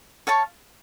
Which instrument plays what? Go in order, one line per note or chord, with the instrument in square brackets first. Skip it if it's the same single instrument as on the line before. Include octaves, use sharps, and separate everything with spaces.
[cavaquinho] C#5 F5 A5 C#6